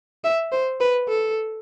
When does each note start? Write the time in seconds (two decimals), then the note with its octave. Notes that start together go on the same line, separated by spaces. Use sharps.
0.24 E5
0.52 C5
0.80 B4
1.08 A4